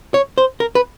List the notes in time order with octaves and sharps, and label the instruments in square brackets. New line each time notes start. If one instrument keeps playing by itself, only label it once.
[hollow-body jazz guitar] C#5
C5
A#4
B4